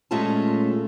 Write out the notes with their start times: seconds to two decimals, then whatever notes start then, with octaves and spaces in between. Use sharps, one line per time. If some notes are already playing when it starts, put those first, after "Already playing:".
0.11 A#2 G#3 A3 C#4 F4 A5